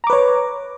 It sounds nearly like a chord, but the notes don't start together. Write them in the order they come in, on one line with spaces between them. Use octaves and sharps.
A#5 D6 B4 C#5